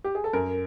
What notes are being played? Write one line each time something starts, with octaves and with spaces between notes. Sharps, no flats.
G4
G#4
A4
F#2 A#4